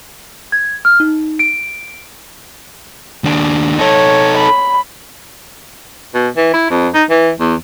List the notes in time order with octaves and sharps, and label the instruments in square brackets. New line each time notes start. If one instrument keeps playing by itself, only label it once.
[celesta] G#6
F6
D#4
D7
[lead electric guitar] D#2 D4
[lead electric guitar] D#4 A4 [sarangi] C#5
[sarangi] B5
[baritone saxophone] B2
E3
E4
F2
D#4
E3
E2